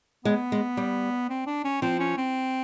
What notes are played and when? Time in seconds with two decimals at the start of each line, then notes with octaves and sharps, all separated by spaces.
0.25 G#3 B3
0.52 G#3
0.77 G3
1.29 C4
1.47 D4
1.64 C#4
1.81 F3 C4
1.99 C#4
2.17 C4